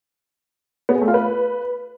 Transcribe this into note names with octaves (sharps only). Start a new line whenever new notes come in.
B3
G#4
A3
F4
B4